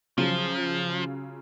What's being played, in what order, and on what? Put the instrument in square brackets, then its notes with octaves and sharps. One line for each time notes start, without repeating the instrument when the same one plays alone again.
[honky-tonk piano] C#3 F#3 F4 [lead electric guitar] F3